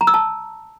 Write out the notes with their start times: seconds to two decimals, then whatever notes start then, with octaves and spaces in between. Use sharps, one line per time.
0.01 A#5
0.07 E6
0.14 A5